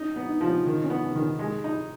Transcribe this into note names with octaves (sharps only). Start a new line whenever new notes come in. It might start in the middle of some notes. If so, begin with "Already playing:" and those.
Already playing: C#4 D#4
B3
D#4
F3
C#4
D#3 D#4
C#4
B3
C#4
D#3
C#4
G#3
D#4